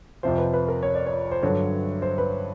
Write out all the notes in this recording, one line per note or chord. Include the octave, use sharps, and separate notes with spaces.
F2 C3 F3 C5
B4
B4
A#4
C#5
D5
C#5
C5
G2 D3 F#3 C#5
C5
B4